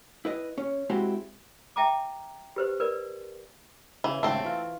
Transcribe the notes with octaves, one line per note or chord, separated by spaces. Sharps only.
E4 B4 D#5
C#4
G#3 C4 E4 F#4 G4
E5 G5 A5 A#5 D6
G4 B4 C5
A#4 B4 D5
C#3 E3
G#1 C#3 A3 C4
E3 F4